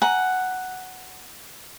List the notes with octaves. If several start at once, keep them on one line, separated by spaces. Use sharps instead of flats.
F#5 G#5 A#5